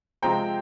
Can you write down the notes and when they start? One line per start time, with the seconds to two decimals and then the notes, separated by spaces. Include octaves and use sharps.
0.22 C3 F3 G#3 C4 G5 A#5